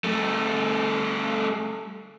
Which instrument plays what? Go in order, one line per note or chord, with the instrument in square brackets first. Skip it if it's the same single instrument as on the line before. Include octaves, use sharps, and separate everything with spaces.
[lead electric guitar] G3 A3